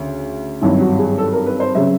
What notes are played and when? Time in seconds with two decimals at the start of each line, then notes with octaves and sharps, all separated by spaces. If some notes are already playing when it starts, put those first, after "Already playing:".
Already playing: D2 C#3
0.61 G#1 G2 D#3 F#3 E4
0.81 F#4
0.99 G#4
1.18 A4
1.33 A#4
1.46 B4
1.60 C5
1.75 C#3 F#3 E5